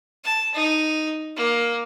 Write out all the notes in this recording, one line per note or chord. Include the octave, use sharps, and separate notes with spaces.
A5
D#4
A#3